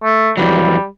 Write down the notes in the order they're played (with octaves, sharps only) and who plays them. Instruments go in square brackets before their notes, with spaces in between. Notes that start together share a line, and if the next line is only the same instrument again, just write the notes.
[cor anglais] A3
[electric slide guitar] F2 E3 F#3 [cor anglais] G3